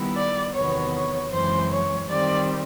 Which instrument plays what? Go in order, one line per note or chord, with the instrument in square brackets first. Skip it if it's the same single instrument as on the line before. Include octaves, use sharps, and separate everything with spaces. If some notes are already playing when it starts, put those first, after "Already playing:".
Already playing: [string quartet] D#3 G3 B3 E4
D5
E2 C3 D#3 F#3 B3 C#5
C#5
F#2 C#3 E3 G#3 C4 C5
C#5
D#3 G3 C4 D5